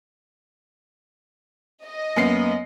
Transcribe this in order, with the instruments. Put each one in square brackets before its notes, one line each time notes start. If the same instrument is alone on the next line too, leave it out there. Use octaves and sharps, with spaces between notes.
[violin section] D#5
[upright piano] F#2 B3 C7 [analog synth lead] A#3